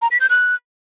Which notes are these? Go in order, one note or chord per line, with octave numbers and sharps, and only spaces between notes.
A#5
B6
G6
F#6